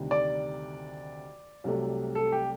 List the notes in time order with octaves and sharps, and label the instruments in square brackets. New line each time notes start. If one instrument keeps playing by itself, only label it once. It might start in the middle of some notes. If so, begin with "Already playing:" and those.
Already playing: [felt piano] D2 C3 D#3 G3
[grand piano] D5
[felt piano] C2 C3 F#3 A3
[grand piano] A4
G4